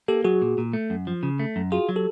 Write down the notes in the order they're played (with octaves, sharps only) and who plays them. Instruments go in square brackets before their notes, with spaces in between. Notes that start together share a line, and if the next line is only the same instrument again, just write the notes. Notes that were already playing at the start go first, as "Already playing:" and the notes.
[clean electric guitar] A#3 [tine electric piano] G4 A4
[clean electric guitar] F#3 [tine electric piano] F#4 G#4
[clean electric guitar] A#2
A#2
A3
F#2
F3
C#3
A3
F#2
[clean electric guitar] F4 [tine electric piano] F#4 G#4
[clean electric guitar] F#3
[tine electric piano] G4 A4